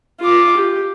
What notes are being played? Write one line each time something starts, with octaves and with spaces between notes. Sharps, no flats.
F4 D6
G4